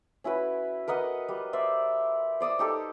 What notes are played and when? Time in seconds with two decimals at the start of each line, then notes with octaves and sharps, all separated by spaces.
0.24 C#4 E4 F#4 B4
0.88 A#4 B4 D#5 F#5
1.28 G3
1.53 C5 D5 E5
2.41 C5 D5 D#6 E6
2.59 D#4 G4 A4